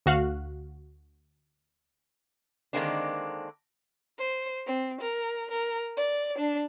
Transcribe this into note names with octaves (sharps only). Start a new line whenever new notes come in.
D2 F#4 F5 F#6
D3 D#3 G#3 A#3 C4 D4
C5
C4
A#4
A#4
D5
D4